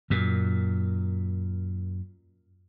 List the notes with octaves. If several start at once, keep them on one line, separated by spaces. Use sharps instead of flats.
F#2 A#2